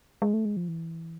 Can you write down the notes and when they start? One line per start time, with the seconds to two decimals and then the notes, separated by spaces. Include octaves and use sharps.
0.22 G#3
0.34 A3
0.45 G#3
0.57 F3
0.68 E3